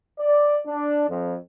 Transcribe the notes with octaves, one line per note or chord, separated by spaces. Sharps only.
D5
D4
F2